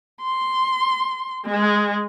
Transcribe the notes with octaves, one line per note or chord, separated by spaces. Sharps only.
C6
G#3